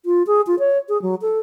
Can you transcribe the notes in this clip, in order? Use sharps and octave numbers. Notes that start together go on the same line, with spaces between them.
F4
G#4
F4
C#5
G#4
F#3
A4